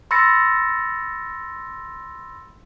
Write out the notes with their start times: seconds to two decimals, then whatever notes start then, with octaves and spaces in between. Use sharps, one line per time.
0.11 B5 C6 E6 A6 A#6 C#7